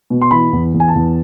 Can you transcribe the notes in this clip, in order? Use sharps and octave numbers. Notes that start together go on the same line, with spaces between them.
B2
C6
E3 B5
E2
E2
G#5
A5
E2